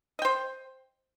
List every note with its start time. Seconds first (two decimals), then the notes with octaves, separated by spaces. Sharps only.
0.19 D#5
0.22 G5
0.25 C5